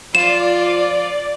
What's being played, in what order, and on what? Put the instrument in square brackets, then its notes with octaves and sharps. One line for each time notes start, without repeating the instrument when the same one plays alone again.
[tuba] F3 [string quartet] F4 [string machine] D5 [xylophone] E7